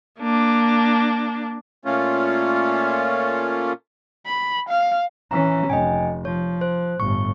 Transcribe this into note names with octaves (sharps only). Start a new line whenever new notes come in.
A#3 D4
A#2 A3 C#4 F4
B5
F5
E3 C#4 A#5 B6
F1 D#5 G5 G#5
F3 C#5
C5
G1 A2 C#6